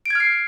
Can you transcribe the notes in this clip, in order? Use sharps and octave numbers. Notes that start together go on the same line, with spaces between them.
F6 G#6 C7 D7